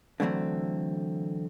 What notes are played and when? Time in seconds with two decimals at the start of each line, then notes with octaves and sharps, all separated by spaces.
0.20 D3 E3 F#3 A3 C4